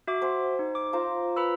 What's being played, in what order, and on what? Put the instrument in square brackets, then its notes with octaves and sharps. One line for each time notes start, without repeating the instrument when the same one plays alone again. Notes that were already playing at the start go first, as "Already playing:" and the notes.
[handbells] F#4 E5 D6
[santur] C5 F#5 G#5
[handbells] D#4
D6
[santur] F4 C5 A#5
[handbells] B4 B5 E6